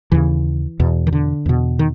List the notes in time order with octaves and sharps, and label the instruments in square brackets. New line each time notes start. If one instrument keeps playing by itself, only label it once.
[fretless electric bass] D#2 C#3 E3
E2 B2
D#3
D3
E2 B2
D#3